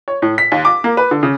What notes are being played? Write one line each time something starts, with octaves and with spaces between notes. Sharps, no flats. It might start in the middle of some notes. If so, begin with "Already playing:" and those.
C#5
A2
B6
D#2
D6
A#3
B4
D3
C#3